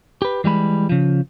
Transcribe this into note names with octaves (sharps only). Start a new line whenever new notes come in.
G4 B4
E3 G3 G#3 B5
C#3 F3